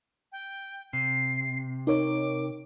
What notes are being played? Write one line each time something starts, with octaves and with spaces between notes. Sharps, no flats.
G5
C3 C7
D#4 A#4 C#5 D6